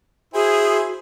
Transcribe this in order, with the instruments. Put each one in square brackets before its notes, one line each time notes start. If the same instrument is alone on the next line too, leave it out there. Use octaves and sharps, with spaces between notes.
[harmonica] E4 C5 G#5 [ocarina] F#4 [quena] G#4